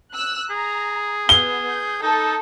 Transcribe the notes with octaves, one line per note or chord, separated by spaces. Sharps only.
E6 F#6
G#4 A#5
B3 G7
G6
D#4 A4